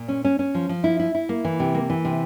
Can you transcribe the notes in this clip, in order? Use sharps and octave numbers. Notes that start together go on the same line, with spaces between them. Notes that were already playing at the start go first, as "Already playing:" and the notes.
Already playing: A#2
C#4
C#4
C#4
F3
F3
E4
E4
E4
A#3
E3
C3
A#3
E3
C3